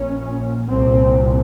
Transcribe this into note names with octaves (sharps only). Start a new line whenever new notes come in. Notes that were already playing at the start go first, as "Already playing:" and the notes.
Already playing: A#1 A#2 C#4
C2 A#2 C4